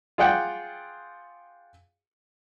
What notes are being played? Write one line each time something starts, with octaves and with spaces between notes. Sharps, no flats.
F4 G#4 D5 F#5 G5